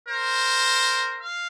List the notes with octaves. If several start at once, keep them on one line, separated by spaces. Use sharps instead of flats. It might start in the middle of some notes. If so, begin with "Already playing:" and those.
A#4 C5
F5